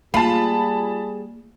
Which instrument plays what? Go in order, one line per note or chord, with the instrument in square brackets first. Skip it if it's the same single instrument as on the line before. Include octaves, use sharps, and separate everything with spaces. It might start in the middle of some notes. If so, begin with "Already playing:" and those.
[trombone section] G3 G#4 [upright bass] A#3 [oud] F4 [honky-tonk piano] A5 B5